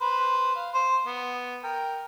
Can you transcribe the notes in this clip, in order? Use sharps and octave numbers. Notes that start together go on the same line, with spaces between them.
B4 C5
F5
C5
B3
A#4 G5